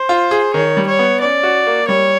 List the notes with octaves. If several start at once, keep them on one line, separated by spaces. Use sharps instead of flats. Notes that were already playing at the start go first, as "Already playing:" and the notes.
Already playing: C5
F4
G#4
D#3 C#5
G3
C#5
B3
C#4 D5
F#4
A#3
G3 C#5